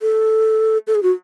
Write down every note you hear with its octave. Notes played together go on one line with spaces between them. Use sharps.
A4
A4
G#4
F#4